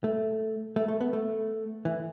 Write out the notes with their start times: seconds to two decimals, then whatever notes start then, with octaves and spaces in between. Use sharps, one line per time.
0.04 A3
0.76 A3
0.88 A3
1.01 B3
1.13 A3
1.85 E3